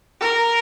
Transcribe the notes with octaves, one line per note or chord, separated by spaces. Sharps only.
A#4